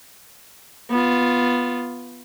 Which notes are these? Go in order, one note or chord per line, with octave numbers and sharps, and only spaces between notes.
B3 F4